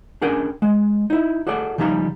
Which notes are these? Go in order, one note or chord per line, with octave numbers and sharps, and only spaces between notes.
C#4 D4 G#4 A#4 G5 G#5
G#3
D#4 E4
F#4 G#4 A4 D5 F#5
C#3 F3 G3 D#4 A#5